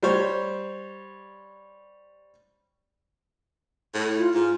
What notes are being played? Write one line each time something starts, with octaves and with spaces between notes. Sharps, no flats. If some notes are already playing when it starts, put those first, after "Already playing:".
G3 C5 C#5
A2
F4
G#2 F4